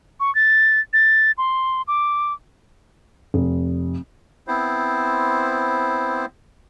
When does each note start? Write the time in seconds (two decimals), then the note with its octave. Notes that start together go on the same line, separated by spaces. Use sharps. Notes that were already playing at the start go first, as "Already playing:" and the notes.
0.20 C#6
0.35 A6
0.93 A6
1.38 C6
1.88 D6
3.34 F1
4.47 B3 C4 E4 C5